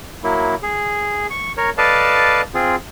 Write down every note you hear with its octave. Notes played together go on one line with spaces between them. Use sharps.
F#3 A#3 E4
G#4
C#6
A#4 C#5
A4 B4 D5 D#5 F5 A5
C4 F4 G#4